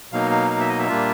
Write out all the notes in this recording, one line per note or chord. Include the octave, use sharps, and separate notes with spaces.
B2 F#3 A#3 D#4 F5
F5
F5
E5
D#5
E5
A#2 G3 A#3 D4 F4